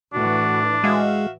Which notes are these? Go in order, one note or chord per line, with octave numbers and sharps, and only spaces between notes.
A2 E3 D4 F#4
G#3 F#4 E5 F5